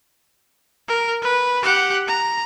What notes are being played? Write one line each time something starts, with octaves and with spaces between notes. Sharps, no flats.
A#4
B4
G4 F#5
A#5